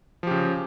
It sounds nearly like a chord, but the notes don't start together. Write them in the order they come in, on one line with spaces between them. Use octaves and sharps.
F3 G4 C#3